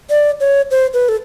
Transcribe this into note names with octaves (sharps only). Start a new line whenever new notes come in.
D5
C#5
C5
B4
A4